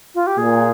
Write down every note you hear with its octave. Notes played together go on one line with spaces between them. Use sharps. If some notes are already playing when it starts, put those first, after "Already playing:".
F4
G4
A#2 G#4